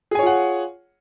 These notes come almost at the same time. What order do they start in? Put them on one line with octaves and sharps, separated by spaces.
G#4 G#5 C#5 F4 F#5